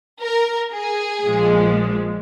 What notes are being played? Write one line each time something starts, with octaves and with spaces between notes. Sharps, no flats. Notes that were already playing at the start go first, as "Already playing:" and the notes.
A#4
G#4
A#1 A#2 F3 G#3